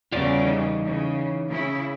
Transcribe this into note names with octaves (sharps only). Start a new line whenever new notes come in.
E2 C#3 G3 F4 D5
E3 D#4
C#3
C#3 E4